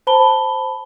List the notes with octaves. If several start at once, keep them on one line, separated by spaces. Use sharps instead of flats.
C5 A5 B5 G7